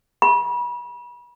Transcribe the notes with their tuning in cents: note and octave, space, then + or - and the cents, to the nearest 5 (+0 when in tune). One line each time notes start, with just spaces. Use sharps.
B5 -35